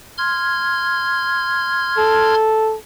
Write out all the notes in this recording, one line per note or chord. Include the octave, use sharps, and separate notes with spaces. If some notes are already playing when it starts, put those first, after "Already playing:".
C6 F6 G#6
A4